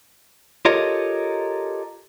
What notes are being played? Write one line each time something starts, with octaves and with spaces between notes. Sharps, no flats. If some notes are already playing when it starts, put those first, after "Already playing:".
F4 G4 A4 A#4 C#5 D#5